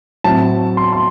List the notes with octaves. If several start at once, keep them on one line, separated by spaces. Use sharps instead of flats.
A2 F#3 C4 A5
C6
C6